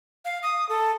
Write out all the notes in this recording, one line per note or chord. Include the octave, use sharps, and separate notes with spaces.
F5
D#6
A4